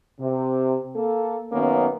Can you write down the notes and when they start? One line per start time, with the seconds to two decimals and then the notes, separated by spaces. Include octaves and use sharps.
0.20 C3
0.95 A#3 A4
1.52 F#2 D#3 A#3 B3 C#4